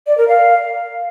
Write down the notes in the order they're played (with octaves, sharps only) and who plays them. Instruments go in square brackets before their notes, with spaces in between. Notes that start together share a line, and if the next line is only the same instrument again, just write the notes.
[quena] D5
A#4
F5